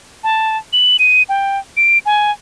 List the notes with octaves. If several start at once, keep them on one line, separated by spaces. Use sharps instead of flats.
A5
F#7
D#7
G5
D7
G#5